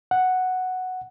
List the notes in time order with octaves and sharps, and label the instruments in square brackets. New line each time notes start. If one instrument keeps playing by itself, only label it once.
[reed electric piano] F#5